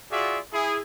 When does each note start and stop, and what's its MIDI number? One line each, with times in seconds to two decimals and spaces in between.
0.12 0.39 65
0.12 0.39 66
0.12 0.39 68
0.12 0.39 74
0.12 0.39 76
0.53 0.80 64
0.53 0.80 68